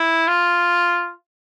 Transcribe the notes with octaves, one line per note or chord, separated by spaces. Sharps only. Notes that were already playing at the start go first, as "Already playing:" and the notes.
Already playing: E4
F4